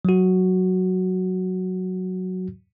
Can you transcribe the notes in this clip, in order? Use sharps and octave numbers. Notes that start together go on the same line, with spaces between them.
F#3 F#4